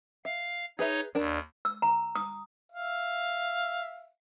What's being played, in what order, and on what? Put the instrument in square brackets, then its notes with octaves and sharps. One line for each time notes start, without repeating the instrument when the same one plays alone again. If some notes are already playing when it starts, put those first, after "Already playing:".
[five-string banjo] E5 [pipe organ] F5
[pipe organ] D#4 C#5 [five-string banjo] G#4 B4 E5
[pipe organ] D#2 [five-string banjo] D4 A#4 A5
[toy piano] E6
A#5
D#6
[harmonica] E5 F5